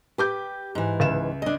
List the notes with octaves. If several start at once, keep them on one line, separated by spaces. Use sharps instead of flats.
G4 B4 D6 G6
G#2 E3
C#2 E5 E7
D4 D#5